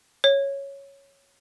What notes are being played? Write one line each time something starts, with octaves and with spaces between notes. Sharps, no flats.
C#5